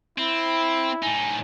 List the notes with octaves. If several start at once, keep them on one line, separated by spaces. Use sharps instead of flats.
C4 E4 B5
A2 D#4 G#5